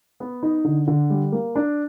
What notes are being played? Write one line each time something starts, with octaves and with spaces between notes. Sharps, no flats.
B3
D#4
D3
D3
G3
A#3
D4